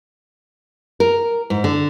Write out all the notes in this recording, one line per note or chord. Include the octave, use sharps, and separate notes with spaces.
A#4
G#2
D3